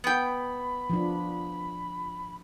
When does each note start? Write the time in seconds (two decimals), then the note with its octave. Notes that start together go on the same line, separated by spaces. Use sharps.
0.04 B3 G5 B5
0.90 F3 D4